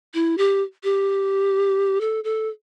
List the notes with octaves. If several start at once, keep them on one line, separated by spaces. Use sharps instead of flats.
E4
G4
G4
A4
A4